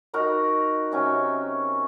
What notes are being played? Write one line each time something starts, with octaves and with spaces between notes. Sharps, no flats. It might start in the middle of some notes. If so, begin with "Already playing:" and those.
D#4 F#4 A#4 B5
C3 F#3 C#4 E5